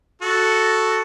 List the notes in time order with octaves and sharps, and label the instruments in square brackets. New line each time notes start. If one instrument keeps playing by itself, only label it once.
[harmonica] F#4 A4